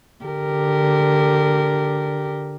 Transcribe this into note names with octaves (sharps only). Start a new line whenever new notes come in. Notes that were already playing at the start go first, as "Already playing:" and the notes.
D3 G4 A#4